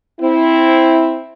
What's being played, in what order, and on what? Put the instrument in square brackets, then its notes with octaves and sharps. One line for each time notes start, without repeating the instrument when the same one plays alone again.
[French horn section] C4 E4